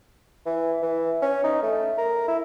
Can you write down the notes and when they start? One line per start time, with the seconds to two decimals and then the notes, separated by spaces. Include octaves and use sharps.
0.46 E3
0.82 E3
1.22 C#4
1.44 D#4
1.63 A3
1.98 A#4
2.28 E4